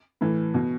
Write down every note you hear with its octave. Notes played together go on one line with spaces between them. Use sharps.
A2 E3
B2